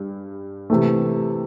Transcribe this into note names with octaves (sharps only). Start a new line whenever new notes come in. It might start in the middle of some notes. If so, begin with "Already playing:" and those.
Already playing: G2
C3 E3 A3